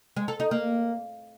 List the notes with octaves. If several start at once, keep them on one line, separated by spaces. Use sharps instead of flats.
G#3
A4
D#4
A#3